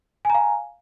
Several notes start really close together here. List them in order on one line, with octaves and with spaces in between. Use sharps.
G#5 A#5 F5